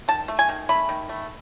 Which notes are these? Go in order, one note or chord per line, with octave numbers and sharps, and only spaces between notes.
D#3 A5
A3
G#5
D#3
A3 B5
D#3
A3